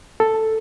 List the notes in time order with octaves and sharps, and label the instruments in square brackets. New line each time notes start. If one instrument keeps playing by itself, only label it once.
[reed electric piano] A4